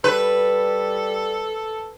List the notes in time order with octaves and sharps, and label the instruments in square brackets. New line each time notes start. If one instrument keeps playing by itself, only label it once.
[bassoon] G3 [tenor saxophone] A4 [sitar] B4